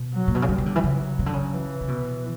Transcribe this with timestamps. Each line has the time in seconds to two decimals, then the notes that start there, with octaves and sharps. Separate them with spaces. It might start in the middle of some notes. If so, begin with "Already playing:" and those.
Already playing: B2
0.14 F#3
0.28 A#2
0.35 B2
0.42 C#3
0.49 D3 G3
0.58 E3
0.66 D3
0.76 E3
0.84 C#3 F#3
1.19 C#3
1.26 D3
1.33 C#3
1.54 E3
1.81 C#3
1.88 B2